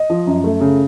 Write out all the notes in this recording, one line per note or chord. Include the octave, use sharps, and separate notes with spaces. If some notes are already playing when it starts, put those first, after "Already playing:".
Already playing: D#5
F3
F#2
A3
C#3